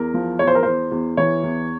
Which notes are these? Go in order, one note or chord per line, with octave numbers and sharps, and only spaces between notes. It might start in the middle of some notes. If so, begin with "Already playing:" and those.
Already playing: E2 A#4
F3
E2 C#5
C5
A#4
E2 C5
E2
E3 C#5
E2